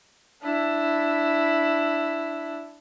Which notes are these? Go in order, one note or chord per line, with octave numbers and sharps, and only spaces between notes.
D4 E4